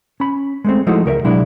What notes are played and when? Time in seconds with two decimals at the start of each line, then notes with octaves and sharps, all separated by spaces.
0.20 C#4 B5
0.65 G#3 A3 C4
0.87 F3 G#3 A3 D#4 E4 F#4
1.06 C#2 A#4 C#5 E5
1.24 B2 F#3 G#3 D4 E4